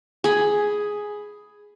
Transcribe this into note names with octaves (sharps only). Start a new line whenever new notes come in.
G#4 B5